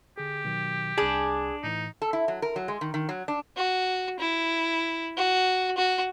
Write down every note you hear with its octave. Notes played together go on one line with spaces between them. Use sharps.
D3 G4 G#4
B2 D#3 F#3
C2 D4 G#4 B5
A2 E3 D#4
A4
E4
F#3
A#4
F#3
G#3
D#3
D#3
F#3
D4
F#4
E4
F#4
F#4